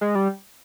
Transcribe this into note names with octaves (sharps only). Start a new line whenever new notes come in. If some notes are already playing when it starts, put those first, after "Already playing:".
G#3
G3